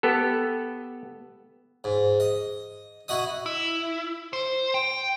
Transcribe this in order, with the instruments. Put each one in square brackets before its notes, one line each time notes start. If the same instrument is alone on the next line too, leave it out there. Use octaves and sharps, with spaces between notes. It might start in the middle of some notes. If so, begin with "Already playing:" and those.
[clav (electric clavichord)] B3 G4 A4
[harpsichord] G#2
D#5
E4 F#4 D#5 D#6
[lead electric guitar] E4
C5
G5